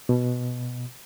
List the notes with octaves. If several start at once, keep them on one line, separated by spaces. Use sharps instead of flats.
B2